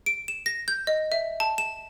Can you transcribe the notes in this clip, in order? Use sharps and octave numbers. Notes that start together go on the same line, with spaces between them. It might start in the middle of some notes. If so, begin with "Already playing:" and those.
D7
E7
A#6
G6
D#5
E5
A5
E7